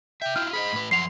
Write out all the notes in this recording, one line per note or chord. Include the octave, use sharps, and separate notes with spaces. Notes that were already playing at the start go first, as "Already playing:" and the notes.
C3 E5 G5
E4 F4 F6
G#4 C5 D#5 B5
A2 B4
F#2 F3 F#5 C6 C7 F7